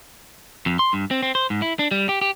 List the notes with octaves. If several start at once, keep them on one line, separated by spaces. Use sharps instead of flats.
F2
C6
G2
C4
C4
C5
G#2
E4
D4
G3
G4
G4